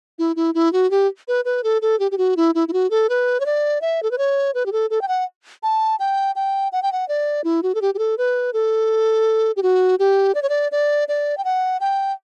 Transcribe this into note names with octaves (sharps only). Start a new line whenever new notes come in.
E4
E4
E4
F#4
G4
B4
B4
A4
A4
G4
G4
F#4
E4
E4
E4
F#4
A4
B4
C#5
D5
E5
A4
B4
C#5
B4
G4
A4
A4
G5
F#5
A5
G5
G5
F#5
G5
F#5
D5
E4
F#4
A4
G4
G4
A4
B4
A4
G4
F#4
G4
D5
C#5
D5
D5
D5
G5
F#5
G5